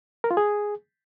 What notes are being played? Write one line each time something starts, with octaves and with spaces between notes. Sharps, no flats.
A#4
F4
G#4